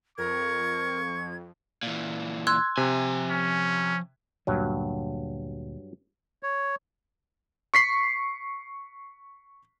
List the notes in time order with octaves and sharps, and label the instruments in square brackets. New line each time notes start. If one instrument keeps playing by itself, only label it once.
[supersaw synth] F2 [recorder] A#4 [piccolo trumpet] C#6 [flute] G#6
[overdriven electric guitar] A#2 E3
[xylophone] C6 E6 F#6 [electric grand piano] G#6
[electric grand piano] C3 [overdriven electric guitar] F3 G#5
[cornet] C#4
[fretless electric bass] D2 A#2 D3 [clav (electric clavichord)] G2 F#3
[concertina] C#5
[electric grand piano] C#6 B6 C7